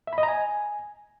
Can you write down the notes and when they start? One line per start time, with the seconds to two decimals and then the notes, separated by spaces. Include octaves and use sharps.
0.07 E5
0.13 B5
0.18 D#5
0.23 A#5
0.28 G#5